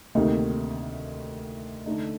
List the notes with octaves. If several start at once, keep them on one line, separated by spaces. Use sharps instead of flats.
D2 C3 D#3 A#3 D#4
D3 A3 D#4